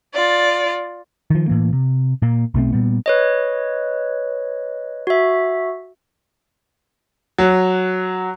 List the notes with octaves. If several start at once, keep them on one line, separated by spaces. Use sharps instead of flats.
F4 D5
D#3 F3
A2 E3 A#3
C3
A#2 A#3
B1 B2 A3 C4
A#2 G3 B3
B4 C#5 D#5
F#4 E5
F#3